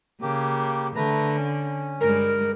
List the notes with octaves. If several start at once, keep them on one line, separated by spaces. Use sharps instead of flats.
C#3 A#3 G4
D3 A3 B4 A#5
C#4
G2 G3 G#3 A#4